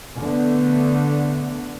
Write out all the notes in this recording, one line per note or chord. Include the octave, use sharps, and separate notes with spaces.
D3 A3 B3